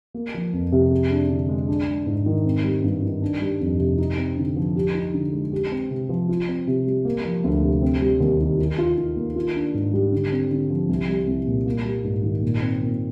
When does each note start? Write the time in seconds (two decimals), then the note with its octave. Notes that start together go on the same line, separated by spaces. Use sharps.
0.14 A#3
0.34 F3
0.53 F2
0.72 C3
0.91 G#4
1.11 D4
1.30 D3
1.49 G#3
1.68 D4
1.87 G#3
2.06 G#2
2.26 D#3
2.45 C4
2.64 G3
2.84 G2
3.03 D#3
3.22 D4
3.41 G3
3.61 F2
3.79 C3
3.98 D#4
4.17 C4
4.37 D3
4.56 F3
4.75 G4
4.95 D#4
5.14 D3
5.33 G#3
5.52 G4
5.71 C4
5.90 C3
6.09 F3
6.29 F4
6.48 C4
6.67 C3
6.86 G3
7.05 A#3
7.25 F3
7.44 D2
7.63 C3
7.82 C4
8.01 G3
8.20 D#2
8.40 D#3
8.59 D#3
8.78 F4
8.98 D#3
9.16 A#3
9.36 F4
9.55 D4
9.74 G#2
9.93 G3
10.12 D3
10.32 C4
10.51 D3
10.70 F3
10.89 C2
11.08 G3
11.27 C2
11.47 A#2
11.66 A#3
11.85 G3
12.04 G#2
12.23 D#3
12.43 A#2
12.62 C4
12.81 A#2